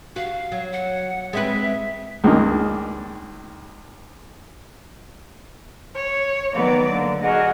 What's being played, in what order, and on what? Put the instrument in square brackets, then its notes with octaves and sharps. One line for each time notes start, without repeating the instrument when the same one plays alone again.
[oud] F#4 [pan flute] F5
[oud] F#3
[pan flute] F#5
[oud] G#3 C4 B4 [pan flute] E5
[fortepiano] C#2 G2 D#3 A#3
[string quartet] C#5
D#3 F#3 B3 D5
D3 A#3
F#4 G#4 A#4 D#5 F#5